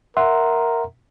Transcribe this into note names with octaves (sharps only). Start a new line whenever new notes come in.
A#4 E5 F#5 C6